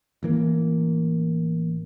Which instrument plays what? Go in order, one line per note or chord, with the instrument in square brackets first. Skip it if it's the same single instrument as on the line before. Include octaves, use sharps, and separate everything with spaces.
[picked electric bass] A1 E3 A#3